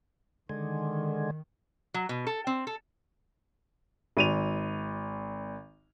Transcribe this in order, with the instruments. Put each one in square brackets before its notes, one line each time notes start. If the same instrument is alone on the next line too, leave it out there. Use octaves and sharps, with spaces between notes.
[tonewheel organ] D3 G#3 [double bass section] D#3
[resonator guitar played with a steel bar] F#3
B2
A4
C4
A4
[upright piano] G#1 D#7 F7